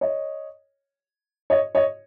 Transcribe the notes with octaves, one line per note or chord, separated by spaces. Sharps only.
C#5 D#5
C#5 D#5
C#5 D#5